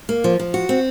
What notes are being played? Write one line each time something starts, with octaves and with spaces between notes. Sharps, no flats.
A#3
F3
F3
F#4
C4